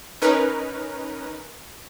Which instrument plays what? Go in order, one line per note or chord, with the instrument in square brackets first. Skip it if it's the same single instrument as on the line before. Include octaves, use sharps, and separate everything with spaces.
[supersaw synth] C#4 D#4 A#4 B4